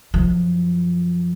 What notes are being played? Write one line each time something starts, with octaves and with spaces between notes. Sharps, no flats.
F#2 F3